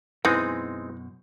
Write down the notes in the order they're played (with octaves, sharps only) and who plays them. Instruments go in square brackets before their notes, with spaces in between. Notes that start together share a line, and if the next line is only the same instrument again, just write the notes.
[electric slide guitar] F#2 B2 [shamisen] E3 [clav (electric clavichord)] G#3 C4 D#4